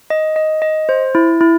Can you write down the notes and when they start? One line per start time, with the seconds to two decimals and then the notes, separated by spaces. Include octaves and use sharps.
0.10 D#5
0.36 D#5
0.62 D#5
0.89 C5
1.15 E4
1.41 E4